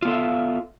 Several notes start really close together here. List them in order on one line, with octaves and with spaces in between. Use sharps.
F4 B3 A4 F5 E5